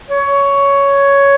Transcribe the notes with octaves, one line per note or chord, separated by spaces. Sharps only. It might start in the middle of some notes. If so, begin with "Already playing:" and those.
C#5